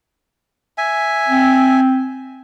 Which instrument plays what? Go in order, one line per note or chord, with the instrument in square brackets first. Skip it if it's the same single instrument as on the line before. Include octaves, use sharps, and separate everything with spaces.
[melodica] E5 G#5
[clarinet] C4